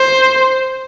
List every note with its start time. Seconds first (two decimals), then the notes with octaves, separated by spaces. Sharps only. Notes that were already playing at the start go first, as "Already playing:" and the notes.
Already playing: C5